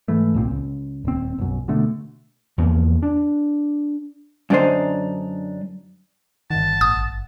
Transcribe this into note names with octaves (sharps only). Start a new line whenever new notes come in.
G#2 E3 A3
C2 A#2 C4
C#2
D#1 C4
B1 F#2
B2 D3 A3
E2 F3 A#3
D4
F#2 D3 D4 D#4 C5 C6
G1 D#3 F#5 A5
A1 D#6